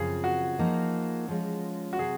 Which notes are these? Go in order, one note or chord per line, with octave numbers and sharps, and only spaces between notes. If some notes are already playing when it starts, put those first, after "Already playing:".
Already playing: F#2 C#3 F3 C4 F4 G#4
F#4
F3 A#3 D#4
F3 G#3 C#4 F4
F#4
C3 F#3 C4 G#4